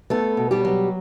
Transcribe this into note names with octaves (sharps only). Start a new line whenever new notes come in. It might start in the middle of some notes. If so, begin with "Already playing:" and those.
A3 B3 A4
B2
G3 G4
F#3